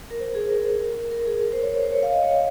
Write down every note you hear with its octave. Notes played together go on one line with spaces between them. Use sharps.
A#4
C5
G#4
A#4
A#4
G#4
A#4
C5
C#5
C#5
C5
C#5
F5
D#5
C#5